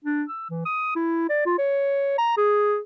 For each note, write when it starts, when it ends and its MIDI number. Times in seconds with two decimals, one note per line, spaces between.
0.05 0.23 62
0.29 0.48 88
0.50 0.65 52
0.65 0.92 87
0.96 1.26 64
1.29 1.44 74
1.46 1.57 65
1.58 2.14 73
2.18 2.35 82
2.37 2.78 68